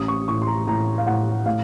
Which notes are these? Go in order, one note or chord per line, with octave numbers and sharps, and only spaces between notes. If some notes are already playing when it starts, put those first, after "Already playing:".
Already playing: A1 D#6
C#6
A2 C#6
C6
A#5
A2 A#5
F5
A2 F#5
A2 F5